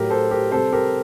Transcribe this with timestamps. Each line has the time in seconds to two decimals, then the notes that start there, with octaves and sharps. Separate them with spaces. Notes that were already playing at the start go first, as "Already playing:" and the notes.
Already playing: A2 F#3 G4 A#4
0.10 A4 C5
0.31 G4 A#4
0.52 C3 G3 A4 C5
0.73 G4 A#4